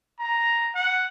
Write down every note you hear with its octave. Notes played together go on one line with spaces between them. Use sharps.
A#5
F#5